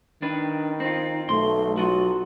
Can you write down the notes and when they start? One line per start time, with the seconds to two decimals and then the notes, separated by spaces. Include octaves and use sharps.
0.22 D#3 D4 B4
0.80 C4 D#4 F4
1.29 B1 A3 C6
1.78 F#3 F4 F#4